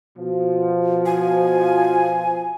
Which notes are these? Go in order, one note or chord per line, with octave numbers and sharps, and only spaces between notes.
B2 F3
G#5